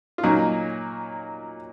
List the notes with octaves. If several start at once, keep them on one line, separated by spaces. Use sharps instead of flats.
F4
A#2 F#3 A#3 C#4 D#4